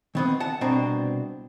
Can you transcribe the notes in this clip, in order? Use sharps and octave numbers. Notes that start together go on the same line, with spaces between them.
D#3 B3 C4
F#5 A5
C2 B2 C4 D4 A#5